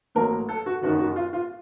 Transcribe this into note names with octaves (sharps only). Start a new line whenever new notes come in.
A1 A2 F#3 A#3 A#4
A4
F#4
F#1 F#2 D#3 F#4
F#4
F4
F4